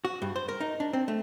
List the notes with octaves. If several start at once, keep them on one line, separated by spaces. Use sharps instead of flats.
F#4
G2
C5
A#4
D#4
D4
C4
A3